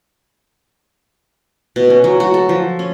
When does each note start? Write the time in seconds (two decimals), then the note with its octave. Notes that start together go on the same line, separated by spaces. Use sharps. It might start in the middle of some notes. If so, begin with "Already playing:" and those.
1.76 B2
1.90 C#4
2.04 F#3
2.20 F#4
2.34 A4
2.49 F3
2.79 C#4